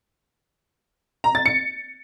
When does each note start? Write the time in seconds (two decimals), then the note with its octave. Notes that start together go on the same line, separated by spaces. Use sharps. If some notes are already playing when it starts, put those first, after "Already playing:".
1.24 A#5
1.35 A6
1.46 C#7